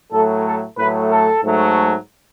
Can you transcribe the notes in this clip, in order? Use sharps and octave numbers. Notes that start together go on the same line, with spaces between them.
A2 F#3 A3 A4
A4
A2 F#3 A3 B4
A4
G#2 F#3 A3